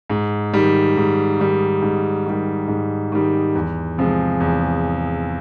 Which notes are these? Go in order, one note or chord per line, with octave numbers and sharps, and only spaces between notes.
G#2
D#3 G3
G#2
D#3 G3
G#2
D#3 G3
G#2
D#3 G3
E2
C3 F3 G#3
E2